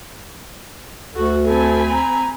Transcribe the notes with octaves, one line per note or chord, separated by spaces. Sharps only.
D2 F#4 A4
C4 A4 G#5 B5
A#5